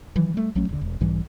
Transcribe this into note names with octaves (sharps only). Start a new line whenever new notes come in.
D#3 E3 F#3
G3 A3
A#1 F#3 A3 C#4
D#1 D3
E1
B1 G#2 E3 G3